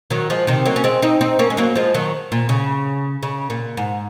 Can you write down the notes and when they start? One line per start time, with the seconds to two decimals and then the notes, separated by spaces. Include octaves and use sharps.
0.10 D#3 F#3
0.30 F3 G#3
0.47 C3 D#3
0.65 F#3 A#3
0.76 C#4
0.84 G#3 C4
1.02 C4 D#4
1.21 C4 D#4
1.39 A#3 C#4
1.50 G#3
1.57 F#3 A#3
1.76 F3 G#3
1.94 D#3 F#3
2.32 A#2
2.49 C#3
3.23 C#3
3.50 A#2
3.77 G#2